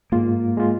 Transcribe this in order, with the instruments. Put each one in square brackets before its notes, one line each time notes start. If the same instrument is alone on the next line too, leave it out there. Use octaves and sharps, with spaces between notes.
[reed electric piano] G#2 G#3 F4 [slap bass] A#3
[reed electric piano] G#3 F4